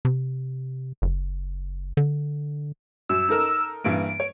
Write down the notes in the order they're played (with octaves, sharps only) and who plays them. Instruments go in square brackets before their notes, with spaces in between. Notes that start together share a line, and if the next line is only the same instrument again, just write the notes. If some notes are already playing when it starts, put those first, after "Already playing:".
[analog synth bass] C3
F#1
D3
[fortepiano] F#2 [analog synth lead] E6
[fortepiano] D#4 A4 A#4
[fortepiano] G2 E3 A#3 [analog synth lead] D7
[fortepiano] C#5